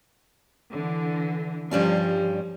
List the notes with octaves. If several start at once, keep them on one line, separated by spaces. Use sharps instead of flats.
D3 E3
G2 F3 G3 C#4